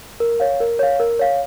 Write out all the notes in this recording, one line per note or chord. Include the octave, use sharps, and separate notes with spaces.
A#4
C#5 F5
A#4
C#5 F5
A#4
C#5 F5